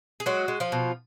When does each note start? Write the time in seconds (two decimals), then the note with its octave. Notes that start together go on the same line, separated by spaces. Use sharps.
0.20 G#4
0.26 F#3 G#3 F#4
0.48 G#3
0.60 F3 F4
0.72 B2